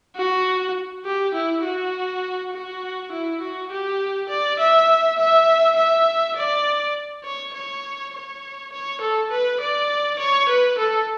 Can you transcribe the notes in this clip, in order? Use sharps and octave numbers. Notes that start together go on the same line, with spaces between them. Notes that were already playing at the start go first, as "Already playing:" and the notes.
F#4
G4
E4
F#4
F#4
E4
F#4
G4
D5
E5
E5
E5
D5
C#5
C#5
C#5
C#5
A4
B4
D5
C#5
B4
A4